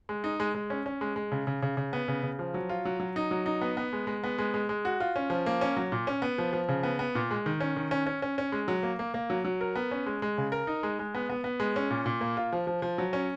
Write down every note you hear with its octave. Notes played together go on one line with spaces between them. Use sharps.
G#3
D#4
G#3
G#3
C#4
C#4
G#3
G#3
C#3
C#3
C#3
C#3
B3
C#3
C#3
F3
F#3
F4
F#3
F#3
D#4
F#3
D#4
B3
B3
G#3
G#3
B3
G#3
G#3
G#3
F#4
F4
C#4
F3
A#3
C#4
F#3
A#2
C#4
B3
F3
F3
C#3
B3
B3
A#2
G#3
D#3
C#4
D#3
C#4
C#4
C#4
C#4
G#3
F#3
A#3
A#3
A#3
F#3
F#3
A#4
B3
C#4
G#3
G#3
C#3
A#4
D#4
G#3
G#3
B3
B3
B3
G#3
C#4
A#2
A#2
A#3
F4
F3
F3
F3
F#3
C#4